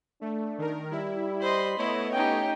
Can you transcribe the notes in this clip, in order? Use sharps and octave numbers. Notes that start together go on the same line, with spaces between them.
A3 D4
D#3 A#4
G3 E4
C5 D#5 B5 C6
A3 B3 E4 C#5 D#5
C#4 D#4 G4 G5